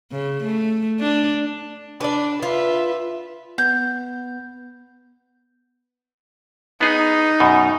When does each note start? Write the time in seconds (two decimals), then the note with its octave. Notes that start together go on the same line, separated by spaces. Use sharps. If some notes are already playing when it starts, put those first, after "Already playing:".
0.12 C#3
0.44 A3
1.00 D4
2.01 D4 B4 D5
2.43 F4 B4 E5
3.58 B3 G6
6.81 B3 D#4 G#4
7.40 F#2 B2